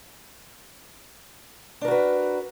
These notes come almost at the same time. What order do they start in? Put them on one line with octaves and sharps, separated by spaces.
D4 A#4 F#4 B4